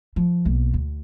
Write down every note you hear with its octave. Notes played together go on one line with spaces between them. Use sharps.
F3
B1 A#3
D2